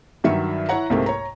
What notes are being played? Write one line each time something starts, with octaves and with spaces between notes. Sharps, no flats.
G2 D#3 F#3 E5 C#7
E4 C#5 F#5 A#5
C2 G#2 C3 A3 A#3
C#5 A#5